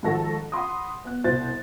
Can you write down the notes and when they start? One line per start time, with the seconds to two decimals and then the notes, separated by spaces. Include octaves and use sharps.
0.03 G#2 D#3 F3 F#4 A4 A#6
0.52 F#5 B5 C6 D#6
1.04 B3 F#6
1.24 C2 B2 C5 A6